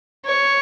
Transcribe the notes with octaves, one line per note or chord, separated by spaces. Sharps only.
C#5